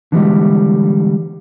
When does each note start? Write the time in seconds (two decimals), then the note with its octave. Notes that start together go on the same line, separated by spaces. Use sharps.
0.12 D3 E3 G3 G#3